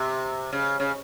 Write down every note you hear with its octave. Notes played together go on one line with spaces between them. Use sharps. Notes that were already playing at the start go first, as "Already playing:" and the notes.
Already playing: C3
C#3
C#3